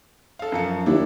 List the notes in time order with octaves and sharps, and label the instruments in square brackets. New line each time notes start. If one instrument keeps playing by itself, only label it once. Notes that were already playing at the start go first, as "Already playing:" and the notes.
[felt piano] A4 F5
F#2 F3 C#7
[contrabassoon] D#2 [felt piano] D4 E4